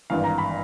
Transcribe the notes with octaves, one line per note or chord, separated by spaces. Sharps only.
G#1 G2 E3 F5
A#5
B5